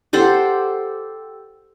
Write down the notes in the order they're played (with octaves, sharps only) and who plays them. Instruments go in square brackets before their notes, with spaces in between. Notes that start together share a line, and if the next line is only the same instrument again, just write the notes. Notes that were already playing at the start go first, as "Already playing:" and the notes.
[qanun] G4 A4 C5 F#5